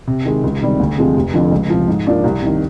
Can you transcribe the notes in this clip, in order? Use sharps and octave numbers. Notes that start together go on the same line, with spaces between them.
C3
D#3 G#3
C#2
C3 D#3 G3
D2
C3 F3 G#3 C4
F1
F2 D3 F3
C#2
C3 F3
G#2
F3 A#3 D4 F4
C2
C3 D#3